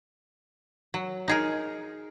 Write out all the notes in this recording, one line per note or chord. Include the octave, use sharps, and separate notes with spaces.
F#3
D#4 G#4 A#4